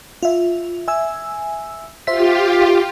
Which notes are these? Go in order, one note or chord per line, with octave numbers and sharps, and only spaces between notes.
F4 E5
E5 G#5 E6
F4 G4 C5 E5 B6